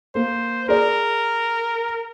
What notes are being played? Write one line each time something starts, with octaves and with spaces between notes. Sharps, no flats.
A#3 C5
G#4 A#4 D5